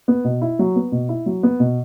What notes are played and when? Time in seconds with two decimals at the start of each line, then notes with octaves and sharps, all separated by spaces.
0.08 B3
0.24 B2
0.41 E4
0.59 F#3
0.76 B3
0.92 B2
1.09 E4
1.26 F#3
1.43 B3
1.60 B2